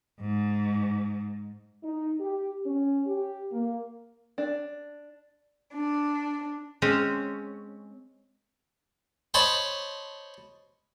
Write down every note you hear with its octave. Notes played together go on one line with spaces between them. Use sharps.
G#2
D#4
G4
C#4
G4
A#3
D4
D4
G#3 C4 C#4
C5 C#5 D#5 A5 B5